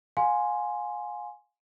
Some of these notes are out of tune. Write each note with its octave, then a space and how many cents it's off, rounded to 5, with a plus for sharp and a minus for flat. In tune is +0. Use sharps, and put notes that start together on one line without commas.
F5 +30 G#5 +0 C6 +0